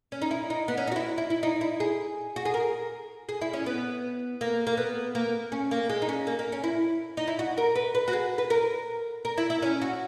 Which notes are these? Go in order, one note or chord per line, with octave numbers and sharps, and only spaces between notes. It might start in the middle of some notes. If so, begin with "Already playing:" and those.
C#4
D#4
E4
D#4
B3
C#4
D#4
F#4
E4
E4
E4
D#4
E4
G#4
F#4
G#4
A#4
G#4
E4
C#4
B3
A#3
A#3
B3
A#3
C#4
A#3
G#3
D#4
C#4
A#3
A#3
C#4
E4
D#4
E4
F#4
A#4
B4
B4
F#4
G#4
B4
A#4
A#4
E4
E4
C#4
F#4